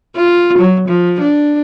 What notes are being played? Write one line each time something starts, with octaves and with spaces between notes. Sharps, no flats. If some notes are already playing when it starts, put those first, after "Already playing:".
F4
F#3
F3
D4